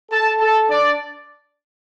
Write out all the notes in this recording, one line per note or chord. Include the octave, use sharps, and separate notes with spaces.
A4 A5
A4 A5
D4 D5